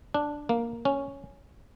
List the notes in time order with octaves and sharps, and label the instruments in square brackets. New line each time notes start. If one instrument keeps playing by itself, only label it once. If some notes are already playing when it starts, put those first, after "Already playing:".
[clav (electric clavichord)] D4
A#3
C#4